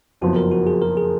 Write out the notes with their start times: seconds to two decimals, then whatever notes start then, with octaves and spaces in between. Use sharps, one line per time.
0.21 F#1 F2 F3 B3 F#4
0.36 A#4
0.52 F#4
0.67 G#4
0.82 A#4
0.97 G#4